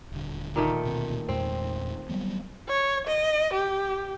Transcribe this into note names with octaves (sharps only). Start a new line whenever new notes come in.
D#1 D3
A#2 D#3 A3
D2 B2 C4
E2 A#2 G#3 C4
F#3 G3 B3
C#5
D#5
G4